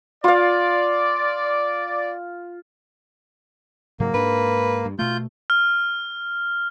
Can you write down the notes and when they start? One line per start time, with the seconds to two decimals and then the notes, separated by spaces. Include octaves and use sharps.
0.24 F4 D5 F5
4.00 G#2 C#3 F#3 A#3
4.14 G#2 D4 B4
4.85 G2
4.99 B2 A3 F4 G6
5.50 F6